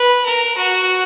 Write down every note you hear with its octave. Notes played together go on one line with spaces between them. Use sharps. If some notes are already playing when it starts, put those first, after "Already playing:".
Already playing: B4
A#4
F#4